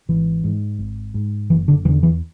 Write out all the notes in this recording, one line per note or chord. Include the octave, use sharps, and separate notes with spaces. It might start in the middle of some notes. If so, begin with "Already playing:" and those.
G#1 E3
G#2
G#1
G#2
F#1 E3
D3
E2 D3 E3
E3